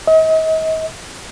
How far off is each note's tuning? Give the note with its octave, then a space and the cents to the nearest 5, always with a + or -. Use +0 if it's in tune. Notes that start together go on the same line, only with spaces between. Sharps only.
D#5 +40